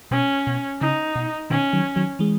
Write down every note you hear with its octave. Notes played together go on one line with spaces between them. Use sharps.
B2 C#4
B2
C#3 D#4
B2
B2 D#3 C#4
D#3 F#3
D#3 F#3
E3 G#3